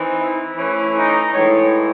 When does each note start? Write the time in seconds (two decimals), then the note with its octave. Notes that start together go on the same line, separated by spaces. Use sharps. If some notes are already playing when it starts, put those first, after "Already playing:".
Already playing: E3 C4 D#4
0.19 E4
0.57 E3 A3 C#4
0.96 D#4
1.33 A2 E3 G#3 D#4 C#5